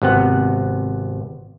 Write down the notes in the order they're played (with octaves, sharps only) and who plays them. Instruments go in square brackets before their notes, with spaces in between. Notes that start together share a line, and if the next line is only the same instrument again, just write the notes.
[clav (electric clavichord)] G#1 C3 B3 F#5